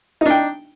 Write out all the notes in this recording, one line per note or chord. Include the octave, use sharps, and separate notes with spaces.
D4 D#4 G5